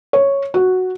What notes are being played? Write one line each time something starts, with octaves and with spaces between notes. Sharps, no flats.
C#5
F#4